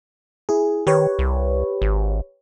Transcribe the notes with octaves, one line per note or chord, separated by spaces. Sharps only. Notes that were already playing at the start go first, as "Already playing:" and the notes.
E4 G#4
D#3 G4 B4 C#5
C2
G#1